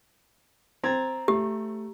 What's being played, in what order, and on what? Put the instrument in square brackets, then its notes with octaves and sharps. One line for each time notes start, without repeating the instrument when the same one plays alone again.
[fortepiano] C4 [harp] A#5 G#6 A6
[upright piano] A3 [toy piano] G4